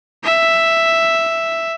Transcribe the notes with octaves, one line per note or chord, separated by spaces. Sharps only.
E5